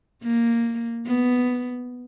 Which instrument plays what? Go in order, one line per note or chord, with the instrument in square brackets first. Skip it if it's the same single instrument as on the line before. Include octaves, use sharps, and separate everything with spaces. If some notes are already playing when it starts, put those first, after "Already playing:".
[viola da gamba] A#3
B3